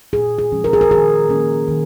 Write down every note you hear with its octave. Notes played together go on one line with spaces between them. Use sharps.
A#2 G#4
G#4
F3 G#3 C#4
A#4
G#4
A#4
D#3 G#4
A#3 C#4
D#3